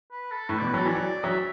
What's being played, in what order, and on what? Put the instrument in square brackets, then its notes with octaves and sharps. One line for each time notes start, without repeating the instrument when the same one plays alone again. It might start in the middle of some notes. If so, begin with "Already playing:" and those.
[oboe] B4
A4
[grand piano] A2 [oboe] B4
[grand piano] B2 [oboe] D5
[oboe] B4
[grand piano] F#3 [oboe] A4
[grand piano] E3 [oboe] D5
[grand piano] F#3
[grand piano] F#3 [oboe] E5